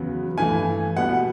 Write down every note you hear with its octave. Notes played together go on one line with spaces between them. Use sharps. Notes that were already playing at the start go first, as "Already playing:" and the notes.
Already playing: E2 C#3 F#3 B3
G2 E3 A3 G#5
B2 G3 B3 F#5